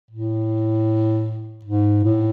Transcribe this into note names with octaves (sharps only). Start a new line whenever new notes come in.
A2
G#2
A2